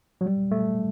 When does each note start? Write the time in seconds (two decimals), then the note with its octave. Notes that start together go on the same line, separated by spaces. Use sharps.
0.21 F#3
0.26 G3
0.51 A3